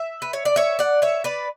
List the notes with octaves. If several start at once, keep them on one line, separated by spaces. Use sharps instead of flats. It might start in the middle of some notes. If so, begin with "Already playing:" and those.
Already playing: E5
B4
C#5
D5
C#5 E5
D5 F#5
C#5 E5
B4 D5